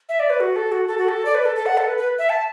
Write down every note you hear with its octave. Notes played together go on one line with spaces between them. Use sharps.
E5
D5
B4
F#4
A4
F#4
A4
F#4
A4
D5
B4
A4
A4
F#5
A4
B4
B4
E5
A5